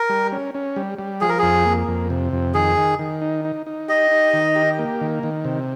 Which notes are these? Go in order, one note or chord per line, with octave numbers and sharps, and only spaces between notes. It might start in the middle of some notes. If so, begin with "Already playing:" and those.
Already playing: A#4
G3
C#4
C#4
G3
G3
F3 G#4
A#4
F2 G#4
A#3
F2
C3
F2
D#3 G#4
D#3
D#3
D#4
D#4
D#4
G4 D#5
D#4
D#3
G4
A#3
D#3
D#3
C3